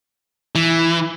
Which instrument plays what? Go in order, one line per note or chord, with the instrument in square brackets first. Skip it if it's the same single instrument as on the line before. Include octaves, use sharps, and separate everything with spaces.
[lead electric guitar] E3